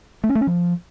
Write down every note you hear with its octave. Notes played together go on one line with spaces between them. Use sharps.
A3
C#4
A3
C#4
F3